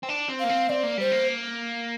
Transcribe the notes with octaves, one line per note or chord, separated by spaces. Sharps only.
C4
D4
C4
A#3 F5
C4
C4 D5
A#3
G3 C5
A#3